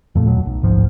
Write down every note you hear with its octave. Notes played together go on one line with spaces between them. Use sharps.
F2 A#2 A3
D#1 B2 F#3
B1
D1 A#1 G#2 F3